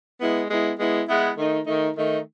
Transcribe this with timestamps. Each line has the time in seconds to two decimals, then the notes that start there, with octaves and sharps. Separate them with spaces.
0.20 G#3 B3 E4
0.49 G#3 B3 E4
0.79 G#3 B3 E4
1.08 G#3 B3 E4
1.37 D#3 A3 D#4
1.66 D#3 A3 D#4
1.95 D#3 A3 D#4